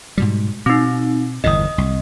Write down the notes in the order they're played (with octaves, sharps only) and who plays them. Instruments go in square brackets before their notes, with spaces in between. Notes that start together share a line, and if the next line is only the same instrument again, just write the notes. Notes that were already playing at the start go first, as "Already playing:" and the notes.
[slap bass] G#2 B2 G3
[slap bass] B2 [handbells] C4 D#4
[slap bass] G1 E2 A2 [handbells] D#5 D#6
[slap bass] C2